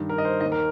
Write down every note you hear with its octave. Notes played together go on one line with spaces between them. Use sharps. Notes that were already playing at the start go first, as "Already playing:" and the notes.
Already playing: G2 D#3
A#4
D#5
C5
D#2 D#3 D#5
A#4